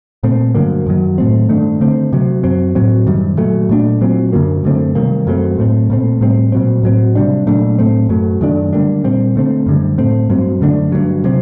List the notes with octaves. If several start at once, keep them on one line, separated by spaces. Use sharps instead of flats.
A#2 A3 C4
G2 D3 F#3 A#3
F#2 D#3 F#3
A2 A3 C4
G2 D#3 A3 D4
D3 A3 C4
C3 F#3 C4
F#2 F#3 C4
A2 F#3 C4
F#2 D#3 G3
A#2 F#3 A3
A#2 A3 D4
A#2 F#3 C4
F#2 D3 F#3 A#3
F#2 D3 A3 C4
C3 D#3 G3 A#3
F#2 F#3 A3 C4
A2 A3 C4
A#2 A3 C4
A2 G3 C4
A#2 F#3 C4
A2 F#3 C4
C3 G3 D4
A#2 F#3 A3 D4
A2 A3 C4
F#2 F#3 A3
F#2 D#3 A3 D4
D3 G3 A#3 D4
A#2 G3 C4
D3 A3 C4
F#2 D3 G3
A2 A3 C4
G2 F#3 C4
F#2 D3 A3 D4
G2 D3 F#3
C3 F#3 C4